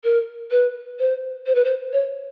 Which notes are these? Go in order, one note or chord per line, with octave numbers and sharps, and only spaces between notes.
A#4
B4
C5
C5
B4
C5
C#5